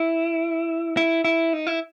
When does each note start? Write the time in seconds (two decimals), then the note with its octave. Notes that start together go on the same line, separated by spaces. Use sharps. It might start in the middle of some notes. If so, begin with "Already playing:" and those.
Already playing: E4
0.97 E4
1.24 E4
1.53 D#4
1.67 E4